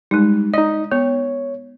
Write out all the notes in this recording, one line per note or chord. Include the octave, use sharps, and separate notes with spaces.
G3 G#3 D#4
D#4 D5 D#5
B3 C#5